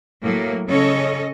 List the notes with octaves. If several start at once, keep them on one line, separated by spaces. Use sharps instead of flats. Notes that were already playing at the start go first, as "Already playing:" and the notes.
A2 F#3 A#3
C#3 C#4 A4 C#5 D#5